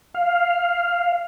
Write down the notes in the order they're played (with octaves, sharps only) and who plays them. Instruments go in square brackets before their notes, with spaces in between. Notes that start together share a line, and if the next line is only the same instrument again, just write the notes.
[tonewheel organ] F5